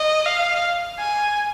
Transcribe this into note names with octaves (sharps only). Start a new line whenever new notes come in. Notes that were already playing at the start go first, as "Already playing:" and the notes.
Already playing: D#5
F5
G#5